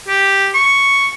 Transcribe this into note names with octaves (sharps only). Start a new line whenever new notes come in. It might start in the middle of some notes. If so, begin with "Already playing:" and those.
G4
C#6